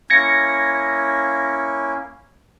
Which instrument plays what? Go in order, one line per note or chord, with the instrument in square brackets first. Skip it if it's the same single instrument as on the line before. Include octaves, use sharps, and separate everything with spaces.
[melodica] A#3 C#4 E4 [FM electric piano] G#6 A#6 C#7